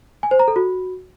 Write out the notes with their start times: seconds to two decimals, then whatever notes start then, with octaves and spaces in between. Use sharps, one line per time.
0.23 G#5
0.31 C5
0.39 A#5
0.48 A4
0.56 F#4